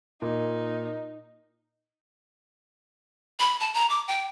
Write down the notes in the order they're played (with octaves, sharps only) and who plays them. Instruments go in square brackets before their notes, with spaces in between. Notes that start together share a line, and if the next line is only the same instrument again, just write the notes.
[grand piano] A#2 [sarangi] D#4
[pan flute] B5
A5
A#5
D6
G5